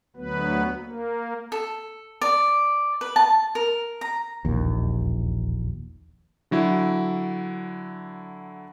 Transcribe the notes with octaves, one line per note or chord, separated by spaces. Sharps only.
D2 F#3 B3 B4
A#3
A4
D5
B4
A5
A#4
A#5
E1 A#1 D#2
D3 F#3 E4